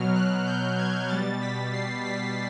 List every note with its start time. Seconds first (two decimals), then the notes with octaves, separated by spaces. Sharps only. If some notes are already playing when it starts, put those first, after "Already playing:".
Already playing: B2 F#3 F6
0.15 F#6
0.46 G6
0.78 G#6
1.09 B2 G3 A6
1.41 B6
1.73 C7
2.04 B6